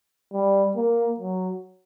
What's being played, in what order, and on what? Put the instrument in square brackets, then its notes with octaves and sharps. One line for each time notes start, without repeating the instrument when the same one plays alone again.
[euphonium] G3
A#3
F#3